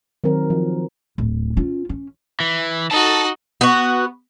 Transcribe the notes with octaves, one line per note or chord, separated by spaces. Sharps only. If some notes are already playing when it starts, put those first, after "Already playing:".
D#3 F#3 C4 A#4
F3
D1
C#4 F4
C#4
E3
D#4 F#4 A4 A5
B3 F#4